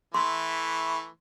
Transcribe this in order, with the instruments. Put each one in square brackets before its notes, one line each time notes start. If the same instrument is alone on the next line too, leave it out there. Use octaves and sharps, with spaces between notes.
[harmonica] E3 A3 [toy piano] C6